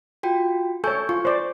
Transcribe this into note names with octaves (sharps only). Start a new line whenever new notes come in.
F4 F#4 G5
A4 C#5 G#5 C#6 G6
F4 C#6
C5 D5